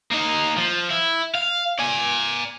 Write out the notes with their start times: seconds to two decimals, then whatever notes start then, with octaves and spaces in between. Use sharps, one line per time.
0.12 A#3 D#4
0.58 F3
0.90 E4
1.35 F5
1.79 D5 G#5